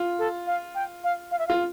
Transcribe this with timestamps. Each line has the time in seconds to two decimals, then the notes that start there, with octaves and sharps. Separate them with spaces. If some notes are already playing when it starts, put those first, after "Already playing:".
Already playing: F4
0.19 A4
0.47 F5
0.75 G5
1.04 F5
1.32 F5
1.39 E5
1.47 F4 F5